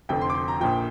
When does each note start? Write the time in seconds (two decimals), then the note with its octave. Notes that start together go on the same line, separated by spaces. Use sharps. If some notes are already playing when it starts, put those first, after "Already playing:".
0.09 F1 F2 D3 G5
0.21 C6
0.30 D6
0.35 C6
0.48 A#5
0.60 A#1 A#2 F3 G5